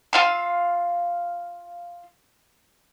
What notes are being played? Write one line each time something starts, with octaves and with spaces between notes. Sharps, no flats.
F4 F5 E6